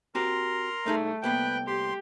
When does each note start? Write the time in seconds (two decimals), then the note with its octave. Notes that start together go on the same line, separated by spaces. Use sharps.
0.15 C4 F#4 G4 A#4 A#5 C6
0.86 C2 A3 D#4 G#4
1.23 C2 A#3 B3 B4 G5 F#6
1.67 G4 C6